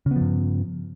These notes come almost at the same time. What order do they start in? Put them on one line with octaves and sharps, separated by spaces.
C#3 B3 F3 G2